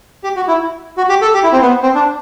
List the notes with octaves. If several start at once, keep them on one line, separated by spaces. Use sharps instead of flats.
G4
F#4
E4
F#4
G4
A4
G4
E4
C4
B3
C4
D4